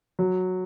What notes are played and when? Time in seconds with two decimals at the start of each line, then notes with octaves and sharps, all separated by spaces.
0.19 F#3